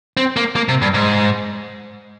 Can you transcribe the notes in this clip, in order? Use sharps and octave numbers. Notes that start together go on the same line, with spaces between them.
C4
A#3
A#3
C3
G2
G#2